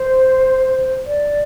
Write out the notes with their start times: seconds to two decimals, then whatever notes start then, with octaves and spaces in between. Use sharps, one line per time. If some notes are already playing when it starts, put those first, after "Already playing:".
Already playing: C5
1.06 D5